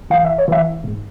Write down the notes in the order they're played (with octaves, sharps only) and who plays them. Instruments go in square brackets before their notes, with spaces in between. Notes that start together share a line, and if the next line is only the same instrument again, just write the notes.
[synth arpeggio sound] E3 F5
E5
C#5
E3 E5
G#2